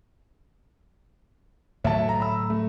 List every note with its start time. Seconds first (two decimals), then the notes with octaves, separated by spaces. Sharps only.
1.84 A2 D3 F#3 E5 A5
2.09 A#5
2.20 B5 E6
2.50 A3